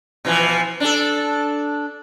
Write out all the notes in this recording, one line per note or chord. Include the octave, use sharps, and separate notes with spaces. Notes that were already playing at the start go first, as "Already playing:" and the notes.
B2 E3 F3
D4 A4